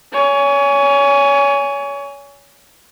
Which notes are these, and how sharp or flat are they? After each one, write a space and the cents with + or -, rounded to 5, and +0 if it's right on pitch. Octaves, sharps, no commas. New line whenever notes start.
C#5 +30 G#5 +0